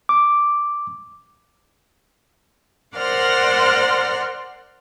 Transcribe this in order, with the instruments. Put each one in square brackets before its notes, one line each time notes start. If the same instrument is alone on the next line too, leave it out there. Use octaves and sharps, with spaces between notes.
[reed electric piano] D6
[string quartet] A#4 C5 D5 F#5 C6 F6